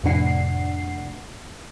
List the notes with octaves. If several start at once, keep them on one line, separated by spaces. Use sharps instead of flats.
F2 A2 C3 D4 F#5 C7